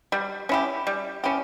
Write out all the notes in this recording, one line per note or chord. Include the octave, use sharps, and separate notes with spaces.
G3
C#4 E4 G4
G3
C#4 E4 G4